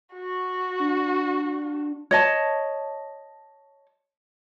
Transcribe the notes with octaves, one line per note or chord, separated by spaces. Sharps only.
F#4
D4
C#5 D#5 A5